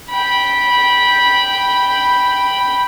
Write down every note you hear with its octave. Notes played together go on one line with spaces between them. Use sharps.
G5 B5